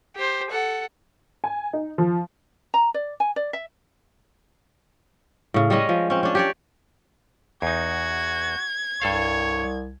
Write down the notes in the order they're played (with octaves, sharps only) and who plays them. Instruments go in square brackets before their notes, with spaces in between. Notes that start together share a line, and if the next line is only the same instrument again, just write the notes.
[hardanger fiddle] G4 C5
A4 F#5
[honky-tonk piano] G#5
D#4
F3
[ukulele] A#5
D5
G#5
D5
E5
[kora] A2 C#3
G3 G#3 C#4 D#5
F3
C4 C#4
C#4 D4
G4 C#5 D5
[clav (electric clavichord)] E2 D#4 [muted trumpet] F#4 [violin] G#6
[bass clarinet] C2 [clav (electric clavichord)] G2 A4 F5 [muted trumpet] C#5